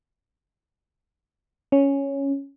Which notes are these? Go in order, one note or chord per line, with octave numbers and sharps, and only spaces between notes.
C#4